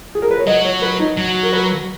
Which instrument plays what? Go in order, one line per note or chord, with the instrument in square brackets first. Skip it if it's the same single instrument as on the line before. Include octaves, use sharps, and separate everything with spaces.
[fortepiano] G#4
A#4
B4
C#5
[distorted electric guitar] F#3 [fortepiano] D#5
[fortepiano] C#5
B4
D#4
[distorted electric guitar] F#3
[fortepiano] A#4
B4